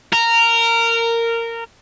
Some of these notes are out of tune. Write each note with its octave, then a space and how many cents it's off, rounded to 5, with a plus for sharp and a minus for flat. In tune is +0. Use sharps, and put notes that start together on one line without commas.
A#4 -15